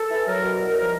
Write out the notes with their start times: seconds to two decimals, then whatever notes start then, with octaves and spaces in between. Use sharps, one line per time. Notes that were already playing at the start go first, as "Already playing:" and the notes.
Already playing: A4
0.11 E3
0.26 F#3 A#4
0.43 B2
0.60 C2
0.76 F3 A#4